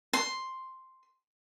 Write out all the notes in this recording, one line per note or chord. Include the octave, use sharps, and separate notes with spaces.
C6